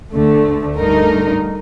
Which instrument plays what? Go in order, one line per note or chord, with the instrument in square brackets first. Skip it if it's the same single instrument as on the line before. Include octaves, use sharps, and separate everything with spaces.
[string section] D2 D3 A3
G2 D3 A3 D#4 A#4